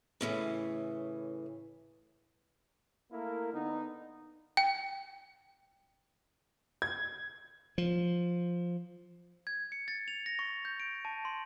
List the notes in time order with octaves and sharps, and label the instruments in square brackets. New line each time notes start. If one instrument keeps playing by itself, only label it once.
[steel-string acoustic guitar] A2 C#3 E3
[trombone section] A3 A#3 E4 A#4
D3 B3 D#4
[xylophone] G5
[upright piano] G#6
[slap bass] F3
[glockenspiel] G#6
C#7
A6
F7
A#6
C#6
G6
D7
A5
C6